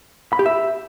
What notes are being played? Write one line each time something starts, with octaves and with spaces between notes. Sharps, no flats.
B5
G4
E5